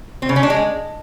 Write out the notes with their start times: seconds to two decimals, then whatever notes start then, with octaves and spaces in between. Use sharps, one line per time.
0.22 C4
0.29 C#3
0.36 C#4
0.43 D4
0.50 G#3